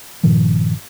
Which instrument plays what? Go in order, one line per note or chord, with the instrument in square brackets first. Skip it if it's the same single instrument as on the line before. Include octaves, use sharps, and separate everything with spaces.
[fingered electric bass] G2 A#2 D#3 F3